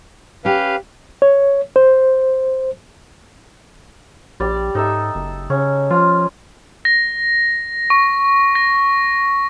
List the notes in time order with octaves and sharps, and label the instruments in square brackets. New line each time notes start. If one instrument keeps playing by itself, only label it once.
[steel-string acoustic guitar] C#4 G4 [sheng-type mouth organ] B4 F5
[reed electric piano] C#5
C5
[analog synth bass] A#1 [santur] G3 D5
[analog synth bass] G#2 [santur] D#4 A4 E5
[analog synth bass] F#1
[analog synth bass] C#3 [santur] C#4
[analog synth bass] F3 [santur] F4
[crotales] A#6
C#6
A#6